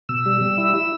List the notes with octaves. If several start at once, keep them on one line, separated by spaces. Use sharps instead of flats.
B2 E6
G3
G3
E4
E4